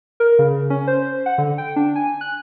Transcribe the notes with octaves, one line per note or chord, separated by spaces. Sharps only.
A#4
C#3
C#4
C5
F#5
D3
G5
D4
G#5
F#6